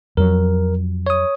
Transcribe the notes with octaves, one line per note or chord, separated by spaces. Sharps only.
F2 F#3 A#4
C#5 D#6